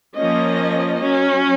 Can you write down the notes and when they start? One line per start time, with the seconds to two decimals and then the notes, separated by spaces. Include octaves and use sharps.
0.16 F3 A#3 C#4 D#5
0.99 F#3 C#4